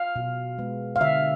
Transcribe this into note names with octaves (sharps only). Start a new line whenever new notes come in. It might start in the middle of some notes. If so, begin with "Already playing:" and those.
Already playing: F5
B2
G#3 B3
F5
D3 E5